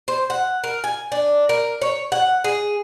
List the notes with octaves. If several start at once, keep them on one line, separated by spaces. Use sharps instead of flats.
C5
F#5
A#4
G#5
D4
A#4
C#5
F#5
G#4